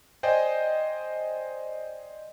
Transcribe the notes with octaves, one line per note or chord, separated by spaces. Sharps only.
C5 D5 D#5 G5 G#5